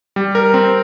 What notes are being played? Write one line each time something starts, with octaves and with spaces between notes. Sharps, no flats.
G3
A#4
C4